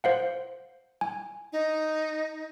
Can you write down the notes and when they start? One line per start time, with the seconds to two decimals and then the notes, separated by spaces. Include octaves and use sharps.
0.04 C5 F5 F#5
1.01 G#5
1.52 D#4